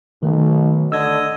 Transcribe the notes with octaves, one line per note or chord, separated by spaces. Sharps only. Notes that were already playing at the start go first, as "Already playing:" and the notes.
B1 D#3 A3
D3 D#5 E6 G#6